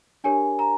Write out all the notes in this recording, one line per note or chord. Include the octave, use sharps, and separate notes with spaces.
D4 G4 A#4 C#5 G#5
A#5